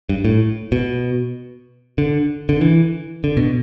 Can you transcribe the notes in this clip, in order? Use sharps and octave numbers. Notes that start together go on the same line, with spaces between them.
G2
A2
B2
D3
D3
E3
D3
B2